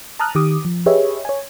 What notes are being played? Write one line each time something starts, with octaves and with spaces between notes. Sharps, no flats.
A5 A#5 D#6 F6 F#6
D#3 G4 D6 D#6
F3
G4 G#4 B4 C#5 D#5 E5
C#5 G#5